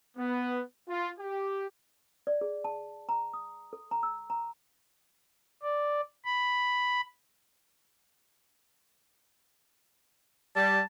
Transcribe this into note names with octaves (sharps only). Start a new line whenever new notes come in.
B3
F4
G4
D5
G#4
A5
A#5
D#6
A4
A#5
E6
A#5
D5
B5
G3 A5